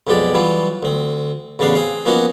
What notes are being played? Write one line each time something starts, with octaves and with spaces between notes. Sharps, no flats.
B1 F2 B2 G#3 G4 D5
E3 F#3 G3 E4 F4
D2 C4
A1 C#3 B3 D4 F5
C4 G#4 F5
F3 A#3 B3 C#4 D#4 F#4